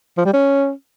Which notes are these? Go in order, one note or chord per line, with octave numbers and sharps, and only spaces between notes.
F3
G3
C#4